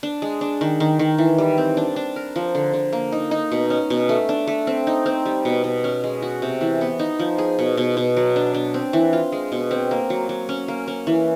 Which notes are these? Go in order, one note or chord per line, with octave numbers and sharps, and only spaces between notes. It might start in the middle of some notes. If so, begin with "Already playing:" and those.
D4
G#3
D4
D#3
D#3
D#3
E3
G3
C4
D4
D4
A#4
F3
D3
D3
A#3
D#4
D#4
B2
C#4
B2
A3
D4
A3
C4
D#4
C4
G3
B2
B2
C#4
G#3
F#4
C3
E3
B3
D#4
F3
G#4
B2
B2
B2
F#3
D4
D4
C4
E3
F4
G#3
B2
C4
A#3
F#3
F#3
C#4
A#3
C#4
E3